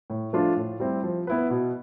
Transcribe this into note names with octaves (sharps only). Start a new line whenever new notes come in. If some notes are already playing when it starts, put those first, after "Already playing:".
A2
F3 A3 D4 F4
A2
G3 C4 E4
F3
B3 E4 B4
B2